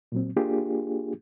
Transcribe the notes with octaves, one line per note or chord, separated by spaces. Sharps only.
A#2 F#3 C4
A#3 D4 F4 G4 G#4